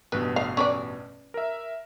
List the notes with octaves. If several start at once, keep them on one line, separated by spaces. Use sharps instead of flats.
A1 G2 B2 B4
F5
C#4 B4 D5
A#4 E5